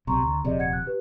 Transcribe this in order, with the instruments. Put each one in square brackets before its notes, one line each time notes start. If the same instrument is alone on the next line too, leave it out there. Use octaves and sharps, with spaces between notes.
[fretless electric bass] B1 C3 [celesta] A#5 C6 C#6
[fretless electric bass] D2
[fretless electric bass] D#1 F2 C3 [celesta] G#4 D5 D#5
[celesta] F#5 G#6 C#7
F#6
G4 B4